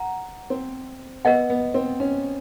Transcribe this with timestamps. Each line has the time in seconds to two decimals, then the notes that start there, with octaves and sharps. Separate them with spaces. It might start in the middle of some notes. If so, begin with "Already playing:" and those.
Already playing: F#5 A#5
0.50 C4
1.25 B3 A#4 D#5 F#5
1.50 B3
1.74 C4
2.00 C#4